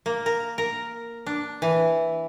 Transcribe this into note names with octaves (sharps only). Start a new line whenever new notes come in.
A#3
A#4
A#4
D4
E3